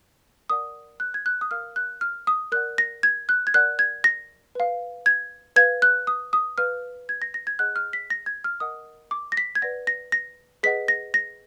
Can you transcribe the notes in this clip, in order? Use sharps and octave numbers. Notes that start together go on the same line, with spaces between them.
A#4 D5 F#5 D#6
F#6
G#6
F#6
D#6
A#4 F5 F6
F#6
F6
D#6
A#4 D5 F#5 F#6
A#6
G#6
F#6
G#6
A#4 D5 F#5 F#6
G#6
A#6
B4 F5
G#6
B4 F5 G#6
F#6
D#6
D#6
B4 F5 F6
G#6
A#6
A#6
G#6
G#4 D#5 F#5 F#6
F6
B6
A#6
G#6
F6
A#4 D#5 F#5 D#6
D6
A#6
B6
G#6
B4 D5 F#5 A#6
A#6
A#6
G#4 B4 D#5 F#5 B6
A#6
A#6